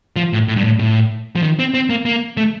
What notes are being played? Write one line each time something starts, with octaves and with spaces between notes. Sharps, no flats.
F3
A2
A2
G2
A2
A2
F3
D#3
C4
C4
A#3
A#3
A3